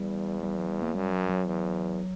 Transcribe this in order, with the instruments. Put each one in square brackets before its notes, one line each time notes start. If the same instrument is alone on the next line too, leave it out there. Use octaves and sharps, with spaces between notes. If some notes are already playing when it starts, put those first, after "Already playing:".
Already playing: [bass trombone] E2 [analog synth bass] G3
[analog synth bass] G3
F#3
G3
A#3
[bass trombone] F#2 [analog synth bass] G3
[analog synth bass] F#3
F#3
[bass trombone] E2